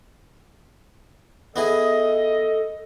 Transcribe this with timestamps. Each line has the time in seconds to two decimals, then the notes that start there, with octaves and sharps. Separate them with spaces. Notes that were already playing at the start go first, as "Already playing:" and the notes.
1.56 B3 E4 G#4 A4 D#5